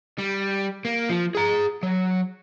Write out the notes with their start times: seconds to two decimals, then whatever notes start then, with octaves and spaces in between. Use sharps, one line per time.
0.18 G3
0.85 A#3
1.09 F3
1.35 G#4 A#5
1.83 F#3